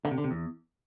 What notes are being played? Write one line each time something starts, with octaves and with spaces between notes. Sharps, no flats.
D3
C3
D3
C3
E2